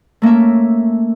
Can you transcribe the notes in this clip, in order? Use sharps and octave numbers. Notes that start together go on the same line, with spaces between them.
A3 A#3 C#4 E5